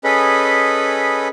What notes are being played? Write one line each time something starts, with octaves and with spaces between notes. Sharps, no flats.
C#4 G#4 A4 B4 D#5 B5